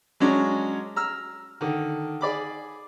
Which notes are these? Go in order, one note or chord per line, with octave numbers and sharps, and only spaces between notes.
F#3 G#3 C#4 D4
A#5 E6 F6
D3 D#3
G#4 D5 B5 D6